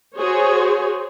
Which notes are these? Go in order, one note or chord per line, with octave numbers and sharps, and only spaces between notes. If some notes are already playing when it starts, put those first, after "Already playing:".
F#4 G#4 C5 C#5